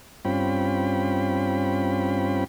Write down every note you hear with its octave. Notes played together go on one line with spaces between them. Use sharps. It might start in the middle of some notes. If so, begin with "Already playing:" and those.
G2 C4 C#4 F4 G5 B5